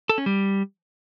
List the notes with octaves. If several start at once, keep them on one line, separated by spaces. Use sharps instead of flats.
A4
C#4
G3